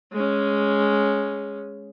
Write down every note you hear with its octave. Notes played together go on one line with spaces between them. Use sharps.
G#3 C#4